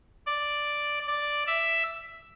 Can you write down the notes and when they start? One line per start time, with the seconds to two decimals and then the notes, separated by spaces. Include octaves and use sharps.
0.27 D5
1.07 D5
1.47 E5